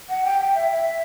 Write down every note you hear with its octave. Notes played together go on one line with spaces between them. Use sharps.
F#5
G5
G5
E5
E5